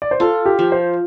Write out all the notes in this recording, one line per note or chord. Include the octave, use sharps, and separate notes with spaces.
D5
C5
F4 A4
G4
F3
C5